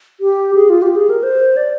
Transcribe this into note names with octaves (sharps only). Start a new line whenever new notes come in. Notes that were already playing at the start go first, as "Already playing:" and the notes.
G4
G#4
F4
G4
G#4
A#4
C5
D5